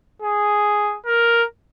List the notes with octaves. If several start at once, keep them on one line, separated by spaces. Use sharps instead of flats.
G#4
A#4